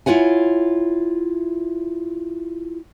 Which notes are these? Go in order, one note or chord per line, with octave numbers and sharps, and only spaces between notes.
E4 F4 C#5 F#5 G#5